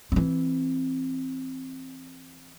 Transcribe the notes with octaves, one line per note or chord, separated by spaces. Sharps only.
E3 C4